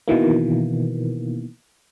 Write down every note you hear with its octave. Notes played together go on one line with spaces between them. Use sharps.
B2 D#3 E3 A#3